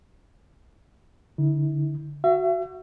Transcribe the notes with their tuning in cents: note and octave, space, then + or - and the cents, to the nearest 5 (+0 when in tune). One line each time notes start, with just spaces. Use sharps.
D3 -10 E4 -40
F#4 +0 E5 +40